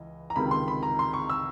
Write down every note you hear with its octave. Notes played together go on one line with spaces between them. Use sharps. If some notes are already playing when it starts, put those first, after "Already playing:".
Already playing: C#2 E3 D#5
A#5
C#2 C3 D#3 B5
C6
B5
A#5
C6
C#6
E6